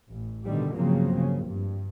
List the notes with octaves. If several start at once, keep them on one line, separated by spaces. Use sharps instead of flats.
A1
G2 B2 D3 D#3 G3
G1 C#3 F3 F#3 A#3 C4
C#3
G2